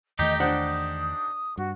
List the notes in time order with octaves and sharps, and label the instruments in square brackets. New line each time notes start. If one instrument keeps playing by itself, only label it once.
[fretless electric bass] E2 D#3 A3 [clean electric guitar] D#4 G4 [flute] D#5
[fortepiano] D4 C5 F#5 [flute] D#6
[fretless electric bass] G2 [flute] F#4